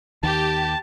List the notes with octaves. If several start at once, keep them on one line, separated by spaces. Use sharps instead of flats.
D#2 D#3 G4 A5